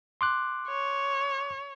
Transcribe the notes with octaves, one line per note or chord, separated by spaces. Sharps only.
C6 D6 F#6
C#5